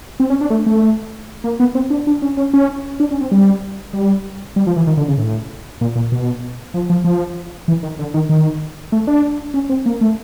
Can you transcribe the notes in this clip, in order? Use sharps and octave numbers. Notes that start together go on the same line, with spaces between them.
C4
C#4
D4
A3
A3
A#3
B3
C4
D4
D4
C#4
C#4
C#4
D4
C#4
C4
G3
G3
G3
F3
E3
D#3
D3
C#3
A2
A#2
A#2
B2
F3
F3
F3
E3
D#3
D3
D#3
D#3
A3
D4
C#4
C4
A#3
A3